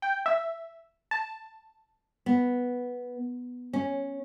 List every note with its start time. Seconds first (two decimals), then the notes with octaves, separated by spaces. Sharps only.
0.02 G5
0.26 E5
1.11 A5
2.26 B3
3.73 C#4